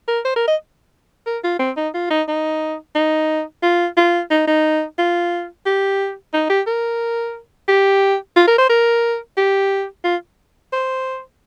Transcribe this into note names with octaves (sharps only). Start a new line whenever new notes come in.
A#4
C5
A#4
D#5
A#4
F4
C4
D#4
F4
D#4
D#4
D#4
F4
F4
D#4
D#4
F4
G4
D#4
G4
A#4
G4
F4
A#4
C5
A#4
G4
F4
C5